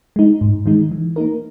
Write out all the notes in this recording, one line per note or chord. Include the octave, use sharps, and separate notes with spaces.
G#3 D#4
G#2
D#3 G#3 D#4
E3
A#3 D#4 A#4